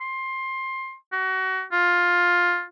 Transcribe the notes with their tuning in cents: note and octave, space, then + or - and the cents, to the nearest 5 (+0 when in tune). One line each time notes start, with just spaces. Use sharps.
C6 +20
F#4 +30
F4 +10